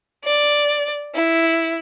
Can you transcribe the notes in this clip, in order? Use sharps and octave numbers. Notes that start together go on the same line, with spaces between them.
D5
E4